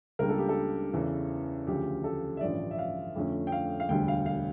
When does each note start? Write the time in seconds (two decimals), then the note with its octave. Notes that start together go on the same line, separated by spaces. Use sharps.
0.19 C#2 C#3 G3 A#3 D4 A#4
0.29 A4
0.38 G4
0.49 A4
0.93 E2 C#3 E3
1.67 D2 C#3 F3 G4
2.04 A4
2.37 E5
2.41 A1 G2 D3 F3 C#4 D5
2.71 E5
2.79 F5
3.16 F2 D3 A3 C#4
3.47 G5
3.52 F5
3.80 F5
3.89 E1 D2 D3 G3 G5
4.08 F5
4.26 F5